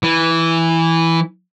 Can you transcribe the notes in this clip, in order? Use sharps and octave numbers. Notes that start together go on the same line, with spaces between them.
E3